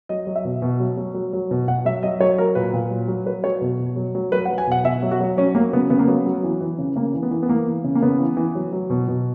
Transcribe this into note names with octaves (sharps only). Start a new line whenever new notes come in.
F#3 D#5
F#3
E5
B2
B2
F#3
F#3
F#3
F#3
B2
B2 F#5
F#3 E5
F#3 D#5
F#3 C#5
F#3 A#4
A#2 B4
A#2
F#3
F#3
F#3 B4
F#3 C#5
B2
B2
F#3
F#3
F#3 B4
F#5
F#3
G#5
B2 F#5
B2 E5
F#3
F#4
F#3
F#3 C#4
F#3 A#3
C#3 B3
C#3 B3
A#3
F#3 B3
F#3
E3
E3
C#3
C#3 A#3
E3
B3
E3
B3
E3 A#3
E3
C#3
A#3
C#3 B3
E3
E3
F#3
F#3
B2
B2